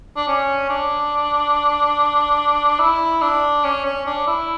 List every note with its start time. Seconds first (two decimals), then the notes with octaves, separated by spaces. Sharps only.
0.16 D4
0.27 C#4
0.70 D4
2.79 E4
3.22 D4
3.64 C#4
3.85 C#4
4.06 D4
4.27 E4